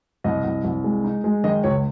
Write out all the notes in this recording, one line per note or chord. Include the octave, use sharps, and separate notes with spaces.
C2 D#5
C2
C2
G#3
D#4
G#3
D#3 D#5
C#2 C#5